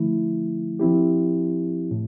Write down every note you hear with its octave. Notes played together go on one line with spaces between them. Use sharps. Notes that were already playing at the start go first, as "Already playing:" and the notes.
Already playing: D3 F3 A3 E4
F3 C4 E4 G4
A2